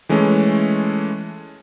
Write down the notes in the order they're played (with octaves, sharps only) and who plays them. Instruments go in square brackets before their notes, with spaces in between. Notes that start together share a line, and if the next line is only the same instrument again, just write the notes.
[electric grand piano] E3 G#3 A3 C#4